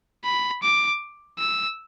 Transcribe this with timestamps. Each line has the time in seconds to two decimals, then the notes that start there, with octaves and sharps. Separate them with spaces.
0.25 B5
0.63 D6
1.39 E6